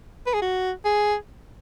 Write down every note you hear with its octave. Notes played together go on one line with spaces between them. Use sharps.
B4
G#4
F#4
G#4